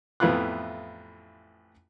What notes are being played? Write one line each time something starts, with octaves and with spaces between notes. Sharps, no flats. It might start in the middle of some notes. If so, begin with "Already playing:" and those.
A1 F2 B3 E4 F4 F#6